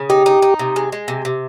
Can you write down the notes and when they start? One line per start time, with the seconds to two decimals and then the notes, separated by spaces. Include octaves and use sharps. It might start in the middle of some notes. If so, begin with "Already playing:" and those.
Already playing: C#3
0.10 D#4 G4
0.26 D#4
0.42 D#4
0.59 C3
0.76 G#3
0.92 G#3
1.08 C3
1.25 C3